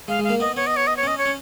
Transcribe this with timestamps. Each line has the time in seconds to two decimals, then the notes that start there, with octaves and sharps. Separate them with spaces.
0.08 G#3 F5
0.19 G#3 F5
0.29 A#3
0.40 B3 D#5
0.56 B3 C#5
0.67 D#5
0.76 C#5
0.87 D#5
0.97 C#5
1.03 C#4 D#5
1.18 C#5
1.25 C#4